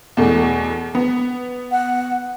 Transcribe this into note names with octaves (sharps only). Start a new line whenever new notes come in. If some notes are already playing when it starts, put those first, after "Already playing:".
E2 B2 A3
B3
F#5